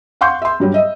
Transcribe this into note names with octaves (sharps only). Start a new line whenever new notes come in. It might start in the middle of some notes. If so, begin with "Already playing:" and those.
F5 F#5 C6 C#6 G6
E5 C6
G2 F#3 G3
D#5 E5